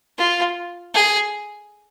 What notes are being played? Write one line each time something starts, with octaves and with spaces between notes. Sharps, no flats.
F4
G#4